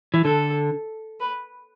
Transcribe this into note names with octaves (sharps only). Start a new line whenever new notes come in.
E3
D3 A4
B4